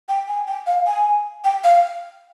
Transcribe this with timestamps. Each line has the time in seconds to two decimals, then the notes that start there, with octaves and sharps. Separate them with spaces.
0.09 G5
0.28 G#5
0.47 G5
0.67 F5
0.86 G#5
1.44 G5
1.64 F5